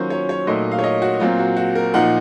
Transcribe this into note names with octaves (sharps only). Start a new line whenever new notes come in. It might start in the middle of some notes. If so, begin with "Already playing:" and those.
Already playing: D#3 F#3 A#3 C#4 F4 C5
C#5
C#5
A#2 F#3 A3 D#4 D#5
F5
C#5
D#5
F#4
A#2 F#3 C4 F4
F#4
F#4
A#4
A#2 F3 A#3 D#4 F#5